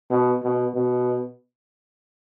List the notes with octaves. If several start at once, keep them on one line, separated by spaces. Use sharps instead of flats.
B2
B2
B2